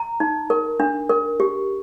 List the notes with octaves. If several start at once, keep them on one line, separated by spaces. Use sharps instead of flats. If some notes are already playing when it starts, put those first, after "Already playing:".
Already playing: A#5
D#4
A#4
D4
A#4
G4